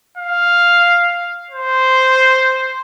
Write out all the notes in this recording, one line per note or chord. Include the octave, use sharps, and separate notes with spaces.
F5
C5